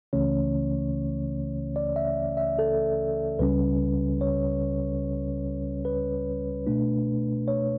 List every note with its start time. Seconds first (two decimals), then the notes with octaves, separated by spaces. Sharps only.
0.13 C#2 C#3 E3 A3 C#4 C#5
1.76 D5
1.96 E5
2.37 E5
2.59 A4
3.39 C#2 C#3 G3 C#4 B4
4.21 C#5
5.85 B4
6.67 B2 A3 D4
7.48 C#5